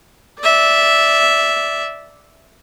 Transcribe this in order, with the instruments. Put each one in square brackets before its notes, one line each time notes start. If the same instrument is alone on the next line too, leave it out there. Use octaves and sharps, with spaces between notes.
[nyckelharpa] D5 E5